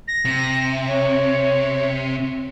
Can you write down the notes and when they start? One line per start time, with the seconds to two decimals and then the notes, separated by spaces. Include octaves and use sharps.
0.08 A#6
0.25 C3
0.88 C#5